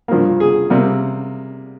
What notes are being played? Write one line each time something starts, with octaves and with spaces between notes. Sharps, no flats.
G2 F3 A#3
G#4
C3 G3 A#3